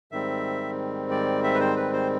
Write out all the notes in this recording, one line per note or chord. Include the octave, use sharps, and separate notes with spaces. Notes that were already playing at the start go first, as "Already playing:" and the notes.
G#2 D#3 G3 C4 E5
D5
E5
B4
C5
B4
C5